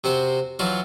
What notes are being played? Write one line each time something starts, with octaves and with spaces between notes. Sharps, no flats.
C3 C4 F#4 C5
E3 F#3 F4 F#4